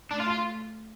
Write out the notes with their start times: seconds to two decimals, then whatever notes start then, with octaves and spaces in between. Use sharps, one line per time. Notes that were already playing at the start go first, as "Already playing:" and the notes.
0.11 A3 D4
0.20 F4
0.30 F4